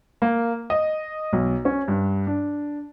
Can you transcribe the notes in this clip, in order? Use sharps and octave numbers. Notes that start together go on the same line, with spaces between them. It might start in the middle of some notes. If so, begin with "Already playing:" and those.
A#3
D#5
B1
C#4
G2
D4